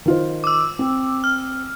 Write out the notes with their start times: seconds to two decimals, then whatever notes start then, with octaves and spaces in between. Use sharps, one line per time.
0.06 D#3 F4 C5
0.44 D6 E6
0.79 C4
1.24 F6